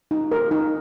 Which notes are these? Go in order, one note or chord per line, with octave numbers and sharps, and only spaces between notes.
D#4
A#4
D#4